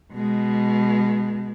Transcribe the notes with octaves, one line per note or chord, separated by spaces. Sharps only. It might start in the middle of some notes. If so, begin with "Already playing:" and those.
B2 G#3